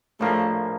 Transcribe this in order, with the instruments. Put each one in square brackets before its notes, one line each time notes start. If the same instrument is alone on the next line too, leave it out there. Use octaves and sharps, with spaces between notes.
[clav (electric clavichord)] A#1 A2 F3 A#3 [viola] A3